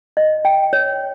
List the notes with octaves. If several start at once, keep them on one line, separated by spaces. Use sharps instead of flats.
D#5
G5
C#5